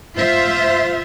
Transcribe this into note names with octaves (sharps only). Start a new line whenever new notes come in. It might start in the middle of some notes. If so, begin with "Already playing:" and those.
F4 C5 E5